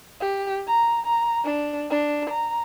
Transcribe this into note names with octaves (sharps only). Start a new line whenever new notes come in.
G4
A#5
A#5
D4
D4
A#5